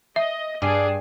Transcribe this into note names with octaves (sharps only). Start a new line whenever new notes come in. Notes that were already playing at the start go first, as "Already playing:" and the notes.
D#5 E5
G2 G3 D4 G#4 G#5 C7